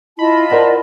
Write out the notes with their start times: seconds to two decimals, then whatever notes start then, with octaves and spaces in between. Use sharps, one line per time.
0.19 E4 F4 D#5 A5 B5
0.51 A#4 C5 D5 F#5